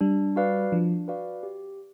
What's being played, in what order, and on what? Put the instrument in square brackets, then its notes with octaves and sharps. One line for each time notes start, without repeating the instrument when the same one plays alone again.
[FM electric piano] G3 [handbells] D4
[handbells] F#4 B4 D5 F5
[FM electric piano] F3 [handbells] D4
[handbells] F#4 B4 D5 F5
G4